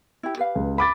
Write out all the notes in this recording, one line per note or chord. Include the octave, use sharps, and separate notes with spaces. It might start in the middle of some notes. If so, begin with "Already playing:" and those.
E4 G4
G4 B4 F5
C#2
B5 D6 A6